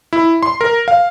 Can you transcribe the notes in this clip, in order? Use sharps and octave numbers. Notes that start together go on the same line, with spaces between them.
E4
C6
A#4
F5